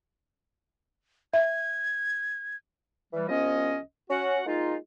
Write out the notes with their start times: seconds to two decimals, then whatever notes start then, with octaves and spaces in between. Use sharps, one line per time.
1.34 E5 G#6
3.13 E3 G3
3.28 C2 F3 B3 C#4 D#5
4.11 C#4 F#4 F#5
4.46 G#3 A#3 D#4 F4